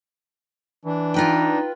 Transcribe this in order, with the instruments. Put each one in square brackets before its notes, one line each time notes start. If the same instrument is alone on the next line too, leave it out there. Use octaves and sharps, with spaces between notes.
[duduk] E3 [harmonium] D4
[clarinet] D#4 [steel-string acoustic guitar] F4 B4 G5